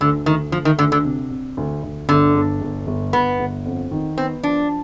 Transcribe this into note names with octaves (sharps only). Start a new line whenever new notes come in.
D2 D3
D2 D#3
D2 F3
D#3
D2 D3
D3
C3
C3
D2
D2
G1 D3
G1
G1
G1
G1 B3
G1
F2
D#3
B3 C4
F3 D4